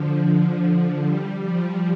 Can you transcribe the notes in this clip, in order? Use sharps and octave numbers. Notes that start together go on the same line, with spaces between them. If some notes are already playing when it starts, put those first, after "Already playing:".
Already playing: D3 F3
F3
F3
G3
F3